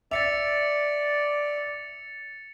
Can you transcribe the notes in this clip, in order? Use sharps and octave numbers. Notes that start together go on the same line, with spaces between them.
D5 E5 A6 C#7 F7